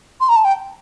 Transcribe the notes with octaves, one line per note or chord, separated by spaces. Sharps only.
C6
A#5
A5
G5